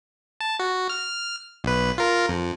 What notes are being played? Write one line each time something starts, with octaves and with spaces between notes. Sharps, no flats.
A5
F#4
F6
B1 B4
F4 A#4
F2